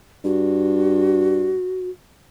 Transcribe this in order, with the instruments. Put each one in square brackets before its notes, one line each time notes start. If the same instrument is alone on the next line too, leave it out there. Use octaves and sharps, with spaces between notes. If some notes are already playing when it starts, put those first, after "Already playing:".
[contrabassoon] G2 [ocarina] F#4